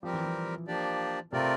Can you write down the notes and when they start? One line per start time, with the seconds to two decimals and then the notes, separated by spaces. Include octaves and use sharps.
0.03 F3 G3 C4 G4 A#4
0.13 E3
0.24 E3
0.68 F3 A#3 D4 G4 D5
1.32 C3 A3 C4 F4 A#4 D5